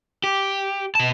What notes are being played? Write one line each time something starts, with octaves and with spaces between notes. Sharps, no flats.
G4
B2 A5